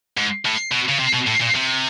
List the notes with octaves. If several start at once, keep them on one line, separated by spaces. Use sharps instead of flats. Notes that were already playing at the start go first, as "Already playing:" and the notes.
G#2
A2
B2
C#3
C3
B2
A2
A#2
C3